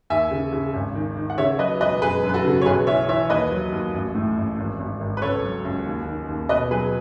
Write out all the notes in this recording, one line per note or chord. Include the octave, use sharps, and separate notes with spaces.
D#2 E5 G#5
C#3
C#3
G#1
D#3
D#3
F#5
C#3 C#5 E5
F#3 B4 D#5
E1 B4 D#5
F#2 G#4 B4
F#2
B4
F#4 A4
C#3
C#5
B1 G#4 B4
E3 C#5 E5
E3 C#5 E5
D#2 B4 D#5
F#3
D#2
A1
A2
A1
G#1
G#1
G#1
B4
C#2 A4 C#5
F#3
C#2
D#2
D#3
D#2
B2 B4 D#5
F#3 G#4 B4